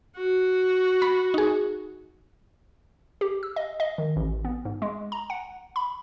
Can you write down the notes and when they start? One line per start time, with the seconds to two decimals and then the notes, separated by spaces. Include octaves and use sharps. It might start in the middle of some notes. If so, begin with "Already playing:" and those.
0.16 F#4
1.02 B5
1.34 D#4 G#4
3.21 G4
3.43 E6
3.56 D#5
3.80 D#5
3.98 D#3
4.16 A1
4.45 B3
4.65 G#2
4.82 G#3
5.12 A#5
5.30 F#5
5.76 B5